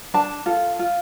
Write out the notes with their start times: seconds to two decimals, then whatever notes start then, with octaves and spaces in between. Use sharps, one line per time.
0.14 D4 A5
0.46 F4 A4
0.79 F4